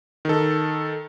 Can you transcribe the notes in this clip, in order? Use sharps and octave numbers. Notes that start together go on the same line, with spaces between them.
D#3 A4